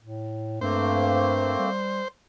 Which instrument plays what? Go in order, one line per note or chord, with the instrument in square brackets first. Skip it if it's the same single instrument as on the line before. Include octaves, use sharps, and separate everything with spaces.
[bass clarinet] A2
[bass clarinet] G2 [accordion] A3 A#3 C4 [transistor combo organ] C5
[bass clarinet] G3